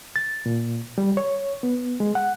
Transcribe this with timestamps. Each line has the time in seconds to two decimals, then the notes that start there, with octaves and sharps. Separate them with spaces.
0.16 A6
0.46 A#2
0.98 G3
1.17 C#5
1.63 B3
2.00 G#3
2.15 F#5